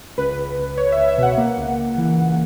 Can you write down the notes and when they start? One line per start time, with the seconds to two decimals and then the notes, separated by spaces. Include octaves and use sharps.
0.18 C#2 B4
0.38 C#2
0.58 C#2
0.77 C#2 C#5
0.92 E5
0.98 C#2
1.08 E5
1.18 B2
1.23 F#5
1.38 A#3
1.57 C#2
1.77 C#2
1.98 E3
2.18 C#2